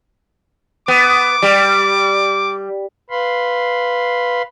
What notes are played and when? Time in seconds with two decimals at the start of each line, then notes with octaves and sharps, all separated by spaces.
0.88 B3 D6
1.42 G3
3.10 B4 F5 B5 C6